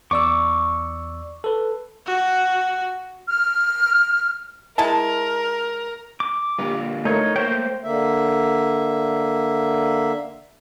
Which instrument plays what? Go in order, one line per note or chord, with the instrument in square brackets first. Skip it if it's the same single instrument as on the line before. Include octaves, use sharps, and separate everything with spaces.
[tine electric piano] E2 D5 E6 [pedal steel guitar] C#6 D6
[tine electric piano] A4 B4
[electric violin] F#4
[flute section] F6
[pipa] G#3 E4 A5 [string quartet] A#4
[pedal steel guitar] D6
[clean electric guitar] A#2 D3 F4 [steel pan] G3
[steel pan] A3 A#4 [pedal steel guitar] D#4 C#5
[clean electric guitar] A3 A#3 [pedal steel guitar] C5 G5 [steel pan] C#5
[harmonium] D3 A#3 E5